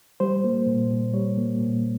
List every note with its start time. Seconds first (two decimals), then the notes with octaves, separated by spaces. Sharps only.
0.20 G3 C5
0.44 A#3
0.67 A#2
0.90 A#2
1.14 G3 C#5
1.38 A#3
1.60 A#2